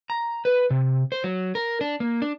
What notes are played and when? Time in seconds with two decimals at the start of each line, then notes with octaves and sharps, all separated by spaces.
0.10 A#5
0.45 B4
0.70 C3
1.12 C5
1.24 F#3
1.55 A#4
1.81 D4
2.00 A#3
2.22 D4